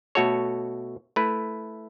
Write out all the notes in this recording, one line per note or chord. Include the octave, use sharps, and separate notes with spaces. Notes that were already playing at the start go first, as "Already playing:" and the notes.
B2 A3 F#4 A4 C#5
A3 E4 B4